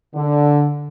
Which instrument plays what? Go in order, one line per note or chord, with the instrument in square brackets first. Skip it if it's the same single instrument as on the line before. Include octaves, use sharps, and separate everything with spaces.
[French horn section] D3